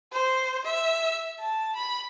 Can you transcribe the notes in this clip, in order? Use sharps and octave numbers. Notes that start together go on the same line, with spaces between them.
C5
E5
A5
B5